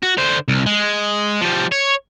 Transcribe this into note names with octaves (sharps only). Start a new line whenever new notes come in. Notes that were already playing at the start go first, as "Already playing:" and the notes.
F#4
D3 C5
C2
G#3
F3 G3
C#5